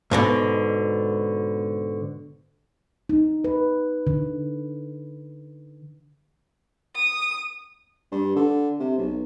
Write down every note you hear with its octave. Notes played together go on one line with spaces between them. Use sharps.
G#2 B2 D3
D#4
B4
D3
D#6
G2
D3
C3
B1